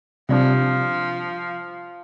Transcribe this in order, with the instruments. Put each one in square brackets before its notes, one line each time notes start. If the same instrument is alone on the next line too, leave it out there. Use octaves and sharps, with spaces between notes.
[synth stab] C3 G3 D4 [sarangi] F3